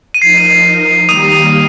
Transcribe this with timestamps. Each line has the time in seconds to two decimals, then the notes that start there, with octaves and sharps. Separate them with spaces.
0.14 D#7
0.22 F3 D#4 A#4 C7
1.08 D#3 G3 A#3 G4 A#4 D#6 D#7